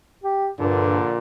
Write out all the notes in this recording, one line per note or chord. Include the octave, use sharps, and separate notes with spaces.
G4
A#1 G2 A#2 D3